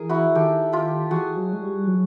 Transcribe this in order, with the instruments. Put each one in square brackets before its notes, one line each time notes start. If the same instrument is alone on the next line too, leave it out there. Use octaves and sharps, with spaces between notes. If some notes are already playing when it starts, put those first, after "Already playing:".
Already playing: [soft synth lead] E3 [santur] G#4 A#4
[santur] E4 F#4
[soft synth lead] D#3 [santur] G4 A4
[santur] F4 G4
[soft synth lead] E3 [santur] F#4 G#4
[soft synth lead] F#3
G#3
G3
F#3